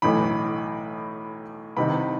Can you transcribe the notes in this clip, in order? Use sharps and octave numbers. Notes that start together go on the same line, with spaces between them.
B1 A2 E3 B5
C2 C3 D#3 B5